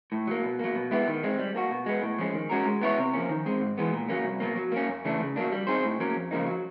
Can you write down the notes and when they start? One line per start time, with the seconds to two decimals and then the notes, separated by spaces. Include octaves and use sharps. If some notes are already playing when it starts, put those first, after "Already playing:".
0.12 A2
0.27 F#3 A#3
0.43 B2
0.59 F#3 A#3
0.75 B2
0.91 G#3 B3 E4 G4
1.07 D#3
1.23 G#3 C4
1.39 G3
1.55 A#3 D4 F#4
1.71 B2
1.86 G#3 B3
2.02 A2
2.19 F3 G#3 C#4
2.34 D#3
2.50 G#3 C#4 F#4 A#4
2.65 G#3
2.81 B3 E4 A4 C#5
2.98 C3
3.14 F3 A#3 C#4
3.30 D#3
3.46 G#3 C4
3.61 G#2
3.78 E3 G#3 B3
3.93 A#2
4.09 F#3 A#3 C#4
4.25 C2
4.40 B2 F#3 A#3
4.57 F#3
4.72 A#3 C#4
4.88 F#2
5.05 C#3 E3 A3 D4
5.20 C#3
5.36 F#3 A#3 D4
5.52 G3
5.67 C4 D#4 G#4 C5
5.84 A2
6.00 F#3 A#3 C#4
6.15 F2
6.31 C#3 F3 A#3 D#4
6.47 F#3